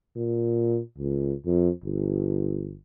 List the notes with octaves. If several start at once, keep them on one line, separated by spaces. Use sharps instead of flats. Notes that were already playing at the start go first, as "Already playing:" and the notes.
A#2
C#2
F2
G1